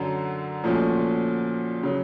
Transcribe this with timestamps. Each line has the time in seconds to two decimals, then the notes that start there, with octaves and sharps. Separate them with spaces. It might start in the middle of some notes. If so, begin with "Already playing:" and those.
Already playing: F#2 D3 F#3
0.64 A#2 F3 A3 C#4 F#4
1.83 C#3 F#3